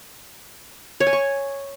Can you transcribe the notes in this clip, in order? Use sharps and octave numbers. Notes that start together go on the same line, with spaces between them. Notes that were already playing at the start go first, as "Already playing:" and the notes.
C#5
G#5
C#6